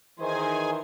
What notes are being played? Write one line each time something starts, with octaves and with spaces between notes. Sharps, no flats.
D#3 E3 G#4 C5 G#5